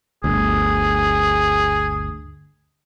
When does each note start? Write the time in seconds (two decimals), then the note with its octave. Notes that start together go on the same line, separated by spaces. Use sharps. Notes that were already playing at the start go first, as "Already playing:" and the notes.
0.24 G1 D2 G#4